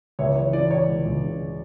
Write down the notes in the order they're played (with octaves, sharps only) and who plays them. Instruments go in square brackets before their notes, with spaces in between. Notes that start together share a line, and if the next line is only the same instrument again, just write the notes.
[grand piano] C#2 C#5 E5
E3 C#5
E3 D5
E3 C#5
C#2
C#2
C#3